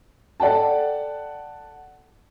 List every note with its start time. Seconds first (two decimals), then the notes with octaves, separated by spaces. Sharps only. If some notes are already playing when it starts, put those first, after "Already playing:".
0.40 A4 D5 F#5 G5 A5